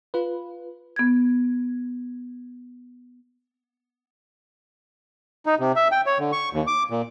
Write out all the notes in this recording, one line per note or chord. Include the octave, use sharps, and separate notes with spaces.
F4 B4
B3 G#6
D#4
C3
E5
G5
C#5
D3
C#6
D#2
D6
A#2